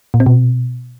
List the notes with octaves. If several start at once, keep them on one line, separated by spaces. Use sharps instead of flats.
A#2
C4
B2